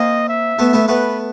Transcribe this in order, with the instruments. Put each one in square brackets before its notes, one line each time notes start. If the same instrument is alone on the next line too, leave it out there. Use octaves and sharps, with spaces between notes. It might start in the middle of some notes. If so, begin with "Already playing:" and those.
Already playing: [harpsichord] A#3 C4 [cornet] D#5
[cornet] E5
[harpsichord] A3 B3
A3 B3
[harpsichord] A3 B3 [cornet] B4